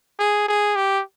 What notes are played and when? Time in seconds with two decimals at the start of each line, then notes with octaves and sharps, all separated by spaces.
0.19 G#4
0.48 G#4
0.76 G4